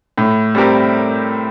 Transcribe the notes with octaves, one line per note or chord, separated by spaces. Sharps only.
A2
G3 C4 G4 A#4